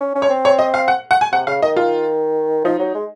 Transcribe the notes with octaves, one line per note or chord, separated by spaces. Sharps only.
C#4
C#4
C#5
C4
C#5
D#5
F5
F#5
F#5
G#5
C3 F#5
C#3 F5
D#3 D#5
F4
F3 D#4
F#3
G#3